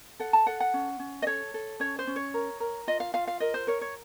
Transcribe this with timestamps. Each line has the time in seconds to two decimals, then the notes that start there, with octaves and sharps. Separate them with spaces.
0.20 A4 F#5
0.33 A5
0.47 A4 F#5
0.60 F#5
0.74 C#4
0.99 C#4
1.22 D#5
1.26 A4 C#5
1.54 A4
1.80 C#4 C#5
1.99 C5
2.07 C#4
2.16 C#5
2.34 A#4
2.60 A#4
2.87 F4 D#5
3.00 F5
3.14 F4 F5
3.27 F5
3.40 A#4 D#5
3.54 C5
3.67 A#4 C#5
3.81 C#5